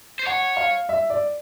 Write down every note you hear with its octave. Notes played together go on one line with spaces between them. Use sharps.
C5
C#5 F#5
F5
E5
D5